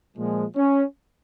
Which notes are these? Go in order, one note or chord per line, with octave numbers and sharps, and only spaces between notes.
A#2 F3 G#3
C#4